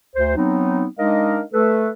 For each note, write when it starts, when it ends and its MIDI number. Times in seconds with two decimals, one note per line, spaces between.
0.16 0.34 38
0.16 0.34 72
0.36 0.86 54
0.36 0.86 59
0.36 0.86 60
0.36 0.86 63
0.99 1.41 56
0.99 1.41 62
0.99 1.41 63
0.99 1.41 70
0.99 1.41 75
0.99 1.41 77
1.53 1.90 57
1.53 1.90 69
1.53 1.90 71